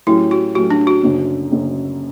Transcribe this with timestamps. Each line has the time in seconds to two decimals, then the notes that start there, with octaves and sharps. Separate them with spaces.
0.07 A2 F#3 C#4 E4 G4
0.31 F#4
0.55 A2 F#3 C#4 F#4 G4
0.70 D4
0.87 F#4
1.03 F#1 F#2 D3
1.51 F#1 F#2 D3